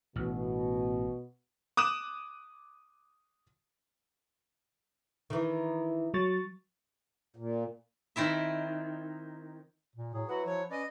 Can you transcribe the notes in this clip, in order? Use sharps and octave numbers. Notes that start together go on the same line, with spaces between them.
A1 B2
D6 D#6 F#6 E7
D#3 E3
F#3 C#6 A6
A#2
D#3 C4 E4 E5
A#2
A2 F#3 G#4
F#3 E4 F#4 B4 F#5
F3 C#5
C#4 B4 D5 D#5